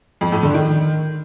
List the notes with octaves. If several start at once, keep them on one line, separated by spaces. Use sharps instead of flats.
F2
A2
D3
D#3